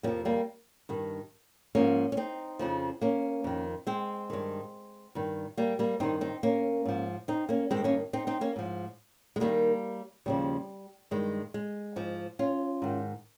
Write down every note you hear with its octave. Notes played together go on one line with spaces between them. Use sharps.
F2 C3 F3 G3 A#3
G3 A#3
G2 D#3
G#2 F3 A#3 C#4
C#4
C4 D#4
F2 C#3 F3
A#3 C#4
F2 D#3
G#3 C4
G2 D#3
G2 D#3
G3 A#3
G3 A#3
G2 D#3 C4 D#4
C4 D#4
A#3 C#4
G#2 F3
C4 D#4
A#3 C#4
G2 D#3 G#3 C4
A#3 C#4
C4 D#4
C4 D#4
A#3 C#4
G#2 F3
G#3
D#2 D#3 G3 A#3
D#2 C#3 F3 G3
G2 D#3 G#3
G#3
G#2 F3
C#4 F4
G#2 D#3